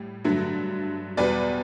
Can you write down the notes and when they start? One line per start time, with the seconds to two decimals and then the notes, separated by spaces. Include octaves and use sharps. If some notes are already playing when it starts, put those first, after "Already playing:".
Already playing: A2 G3
0.24 G2 D3 F#3 A3
1.17 E2 B2 G3 B4 D5